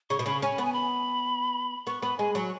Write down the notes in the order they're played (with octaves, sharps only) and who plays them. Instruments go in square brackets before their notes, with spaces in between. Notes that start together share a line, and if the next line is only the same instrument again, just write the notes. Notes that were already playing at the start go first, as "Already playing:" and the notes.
[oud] C#3 [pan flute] C#6
[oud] B2
[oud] C#3 [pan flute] B5
[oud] C#4 [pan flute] G#5
[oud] B3 [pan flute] B5
[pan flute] G#5
B5
[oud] B3 [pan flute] C#6
[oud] B3 [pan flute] B5
[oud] G#3 [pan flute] G#5
[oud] F#3 [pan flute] C#6